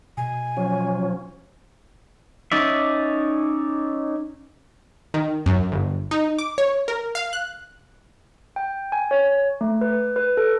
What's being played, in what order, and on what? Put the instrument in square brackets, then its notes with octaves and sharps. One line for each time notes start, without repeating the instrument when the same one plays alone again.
[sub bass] B2 [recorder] G#5
[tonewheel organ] F3 F#3 C#4
[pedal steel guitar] C#4 D#4 D5 E5
[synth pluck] D#3
F#2
G1
D#4
D6
C#5
A#4
F5
F#6
[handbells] G5
G#5
C#5
A3
B4
B4
A4